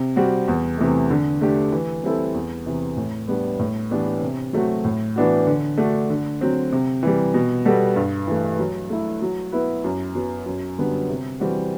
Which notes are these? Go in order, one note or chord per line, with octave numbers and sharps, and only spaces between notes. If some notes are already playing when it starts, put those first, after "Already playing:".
Already playing: C3
G3 C4 F#4
E2
C3 E3 A3
D3
A3 D4 G4
E3
G3 C4 E4 A4
E2
C3 E3
A2
G3 B3 D4
A2
E3 B3 D4 G4
C3
F#3 A3 C4 F#4
A2
E3 B3 D4 F#4
D3
A3 D4 F#4
D3
F#3 C4
C3
E3 G3
B2
G3 B3 F#4 A4
G2
E3 A3
F#3
A3 E4
F#3
B3 E4 B4
F#2
F#3 B3
F#2
D3 G3 B3 F#4
C3
E3 G3 C4 F#4